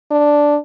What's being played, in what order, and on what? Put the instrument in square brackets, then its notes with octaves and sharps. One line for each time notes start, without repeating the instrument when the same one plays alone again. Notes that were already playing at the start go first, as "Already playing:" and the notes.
[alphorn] D4